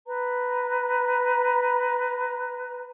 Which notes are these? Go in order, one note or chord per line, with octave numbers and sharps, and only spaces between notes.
B4 A#5